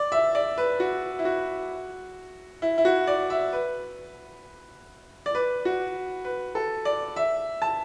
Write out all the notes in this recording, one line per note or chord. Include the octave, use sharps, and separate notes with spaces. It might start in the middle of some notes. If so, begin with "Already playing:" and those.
Already playing: D5
E5
D5
B4
F#4
E4
F#4
E4
E4
F#4
D5
E5
B4
D5
B4
F#4
B4
A4
D5
E5
A5